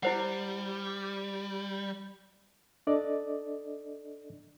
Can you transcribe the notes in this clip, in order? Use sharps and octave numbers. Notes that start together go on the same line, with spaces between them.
G3 E4 C5 F#5
D4 A4 D5 D#5